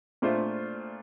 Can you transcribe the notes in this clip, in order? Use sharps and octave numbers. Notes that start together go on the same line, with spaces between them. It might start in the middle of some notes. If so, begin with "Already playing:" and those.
A#2 A3 D4 F4 C5